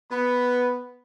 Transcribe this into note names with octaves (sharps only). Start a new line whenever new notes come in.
B3 B5